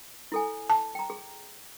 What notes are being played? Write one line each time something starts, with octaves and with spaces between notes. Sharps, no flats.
E4 A4 G#5
A5 D6
G5 A#5
G#4